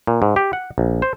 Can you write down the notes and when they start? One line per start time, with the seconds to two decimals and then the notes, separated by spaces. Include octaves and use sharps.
0.07 A#2
0.22 G#2
0.36 G4
0.53 F#5
0.78 A#1
1.02 C5